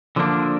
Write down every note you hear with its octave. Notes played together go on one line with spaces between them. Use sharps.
D3 F3 A#3 D4